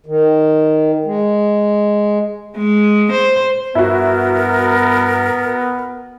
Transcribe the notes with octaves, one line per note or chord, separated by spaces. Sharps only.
D#3
G#3
G#3
C5
G2 B3 E4 F#4 A#4